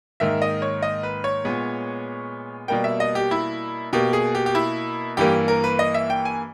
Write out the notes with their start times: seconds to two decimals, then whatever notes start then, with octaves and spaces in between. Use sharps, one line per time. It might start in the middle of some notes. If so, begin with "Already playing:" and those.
0.20 G#2 D#3 A#3 E5
0.42 D#5
0.62 C#5
0.82 D#5
1.03 B4
1.24 C#5
1.45 A#2 G#3 B3
2.68 B2 G3 A#3 G5
2.84 E5
3.00 D#5
3.15 G4
3.31 E4
3.93 B2 A#3 G4
4.13 G#4
4.35 G4
4.46 G4
4.55 E4
5.17 G2 E3 A#3 G4
5.48 A#4
5.64 B4
5.79 D#5
5.94 E5
6.10 G5
6.25 G#5